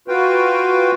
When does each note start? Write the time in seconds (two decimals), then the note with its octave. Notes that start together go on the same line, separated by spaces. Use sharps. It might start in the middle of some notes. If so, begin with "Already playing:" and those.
0.08 F4 F#4 B4 F5 G5